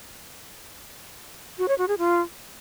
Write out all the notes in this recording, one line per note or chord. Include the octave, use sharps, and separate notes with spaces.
F#4
C#5
F#4
G#4
F4